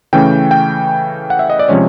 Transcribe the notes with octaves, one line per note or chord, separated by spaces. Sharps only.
C#3 E3 A3 C#4 G5
G5
F#5
E5
D#5
D5
C3 F3 G#3 C#4 C#5